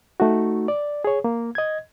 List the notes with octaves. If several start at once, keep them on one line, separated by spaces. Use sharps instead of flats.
A3 D#4 F#4
D5
G#4 C#5
A#3
D#5 G#6